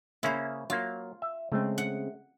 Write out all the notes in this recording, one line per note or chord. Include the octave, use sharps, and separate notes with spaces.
C#3 A#3 C#4 E4 C5
F#3 A#3 F4
E5
C#3 G#3 A3 C4
F#5